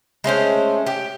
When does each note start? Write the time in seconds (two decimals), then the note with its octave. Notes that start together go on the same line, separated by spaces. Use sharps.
0.24 G#3 A3 C#4 C5
0.86 G4